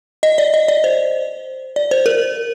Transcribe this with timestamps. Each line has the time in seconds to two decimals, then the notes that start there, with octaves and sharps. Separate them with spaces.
0.23 D#5
0.38 D5
0.54 D#5
0.68 D5
0.84 C5
1.76 D5
1.91 C5
2.06 A#4